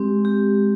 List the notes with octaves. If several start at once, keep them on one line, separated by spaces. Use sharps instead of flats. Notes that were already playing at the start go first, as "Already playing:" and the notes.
Already playing: G#3 C4 G4
G4